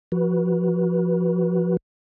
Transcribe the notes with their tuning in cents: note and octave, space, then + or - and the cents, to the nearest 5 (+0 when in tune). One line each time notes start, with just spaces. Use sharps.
F3 +0 F#4 +10 B4 -25